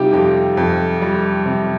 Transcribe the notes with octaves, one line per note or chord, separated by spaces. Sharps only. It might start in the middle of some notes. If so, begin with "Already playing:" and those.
Already playing: C3 G3 D#4 F4 G4
F2 G4
F2
G3
C3